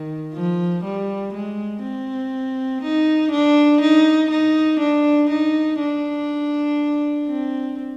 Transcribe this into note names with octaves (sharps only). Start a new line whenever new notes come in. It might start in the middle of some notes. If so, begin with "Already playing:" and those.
Already playing: D#3
F3
G3
G#3
C4
D#4
D4
D#4
D#4
D4
D#4
D4
C4